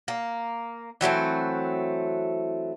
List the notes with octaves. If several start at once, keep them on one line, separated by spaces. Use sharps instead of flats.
A#3
E3 F#3 A3 C4